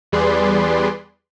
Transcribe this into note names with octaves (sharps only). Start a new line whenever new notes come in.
E2 G3 G#4 B4 D5 C6